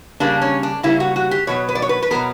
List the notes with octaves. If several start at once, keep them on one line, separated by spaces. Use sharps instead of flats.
C#3 G3 A#3 D4
C#4
D4
C#3 G3 A#3 E4
F#4
F#4
G4
B2 F#3 B3 C#5
B4
D5
C#5
B4
B4
B2 F#3 B3 A#4